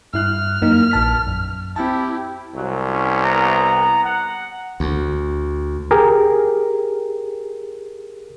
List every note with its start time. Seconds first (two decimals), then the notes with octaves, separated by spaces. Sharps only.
0.14 G2 E4 F6 F#6
0.62 F#2 A#3 D#4
0.91 A#1 A5 B6
1.27 F#2
1.76 C4 E4 G4 A5
2.55 C2 F#3
2.92 C#4
3.24 B3 A#5
4.04 F#5
4.80 D2
5.91 G4 G#4 A#4